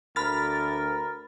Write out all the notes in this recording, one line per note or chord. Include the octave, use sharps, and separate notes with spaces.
D2 A#4 B5 F6 A6